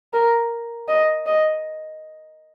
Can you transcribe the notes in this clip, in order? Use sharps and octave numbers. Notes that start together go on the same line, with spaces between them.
A#4
D#5
D#5